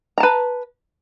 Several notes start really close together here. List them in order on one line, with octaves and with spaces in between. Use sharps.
A#5 A5 B4